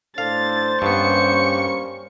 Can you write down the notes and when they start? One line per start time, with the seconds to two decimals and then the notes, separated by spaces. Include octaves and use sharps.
0.18 A2 D4 A4 C5 F5 A6
0.82 G2 G3 A#3 B3 C#4 C#6 C#7